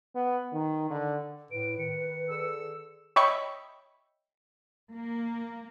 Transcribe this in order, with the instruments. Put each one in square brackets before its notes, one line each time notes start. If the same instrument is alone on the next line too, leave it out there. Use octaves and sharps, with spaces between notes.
[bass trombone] B3
D#3
D3
[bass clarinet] A2 [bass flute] B4 [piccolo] D7
[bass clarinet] D#3 [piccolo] C#7
[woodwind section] D3 G#4 E6
[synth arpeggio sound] C#5 D#5 E5 G5 B5 C#6
[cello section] A#3